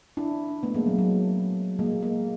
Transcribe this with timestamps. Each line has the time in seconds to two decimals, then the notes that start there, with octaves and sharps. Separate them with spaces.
0.17 D4 E4
0.63 A3 B3
0.74 G#3 A#3
0.86 F#3
0.99 F#3
1.79 G#3 A#3
2.02 G#3 A#3